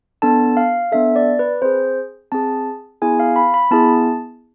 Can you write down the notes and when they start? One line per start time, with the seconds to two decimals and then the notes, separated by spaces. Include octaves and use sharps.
0.22 B3 D4 A4 A5
0.57 F5
0.92 B3 D4 A4 E5
1.16 D5
1.39 B4
1.62 C4 G#4 C5
2.32 C4 G#4 A5
3.02 B3 E4 G#4 G#5
3.20 F5
3.36 B5
3.54 B5
3.71 B3 E4 G#4 A5